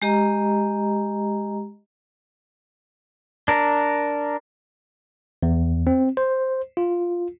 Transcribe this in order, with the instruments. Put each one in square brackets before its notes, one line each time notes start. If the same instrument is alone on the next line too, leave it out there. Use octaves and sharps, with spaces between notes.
[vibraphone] G#3 G4 D#5 A#5
[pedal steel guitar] D4 A#4
[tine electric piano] E2
C4
C5
F4